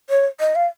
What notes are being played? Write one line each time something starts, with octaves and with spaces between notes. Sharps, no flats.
C#5
D#5
F5